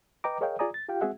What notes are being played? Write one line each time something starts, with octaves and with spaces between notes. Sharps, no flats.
B4 D#5 G5 A#5 D6
G#4 A#4 C#5 D#5 F5 G5
F4 G#4 D5 G#5 A#5 D#6
A6
F4 G4 F5 G5
G#3 C4 F#4 G#4 E5 F#5